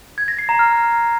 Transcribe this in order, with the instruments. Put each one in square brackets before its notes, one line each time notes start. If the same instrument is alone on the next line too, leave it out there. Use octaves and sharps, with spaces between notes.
[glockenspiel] G#6
A#6
C7
A#5
F6